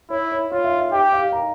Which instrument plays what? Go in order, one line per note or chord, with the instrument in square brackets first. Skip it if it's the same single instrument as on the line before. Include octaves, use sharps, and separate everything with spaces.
[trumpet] E4 [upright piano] C#5
[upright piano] C#5
[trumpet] F4 [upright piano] C#5
[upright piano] E5
E5
[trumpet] G4 [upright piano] G5
[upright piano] F5
A#5